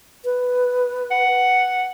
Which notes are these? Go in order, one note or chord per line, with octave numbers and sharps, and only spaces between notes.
B4
F#5